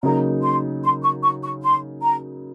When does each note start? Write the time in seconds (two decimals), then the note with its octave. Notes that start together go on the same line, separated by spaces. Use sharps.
0.03 C#3 F#3 A#3 D#4 A#5
0.43 C6
0.84 C6
1.03 C#6
1.23 C#6
1.43 C#6
1.63 C6
2.02 A#5